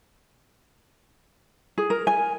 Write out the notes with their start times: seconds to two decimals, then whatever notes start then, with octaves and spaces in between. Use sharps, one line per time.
1.78 G#4
1.90 A#4
2.07 G#5